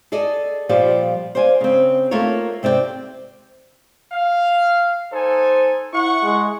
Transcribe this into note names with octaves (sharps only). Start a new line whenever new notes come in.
G#4 A4 D5 D#5
A#2 F3 G3 G4 D5
C5 D5 F5 G#5
C#3 C4
A3 A#3 D#4 F4 A#4 C#5
C3 C4 D5 D#5 G5
F5
D#4 A4 C5 G#5
E4 F#5 C#6
G#3